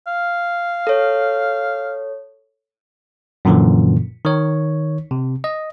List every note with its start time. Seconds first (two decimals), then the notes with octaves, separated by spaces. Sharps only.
0.07 F5
0.87 A4 C#5
3.45 F#2 A#2 D3 E3 F3
4.25 D#3 C#5
5.11 C3
5.44 D#5